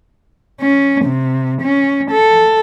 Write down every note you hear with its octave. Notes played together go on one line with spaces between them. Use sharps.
C#4
C3
C#4
A4